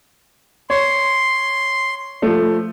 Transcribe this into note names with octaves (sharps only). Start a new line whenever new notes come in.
C#5 C6
F3 A3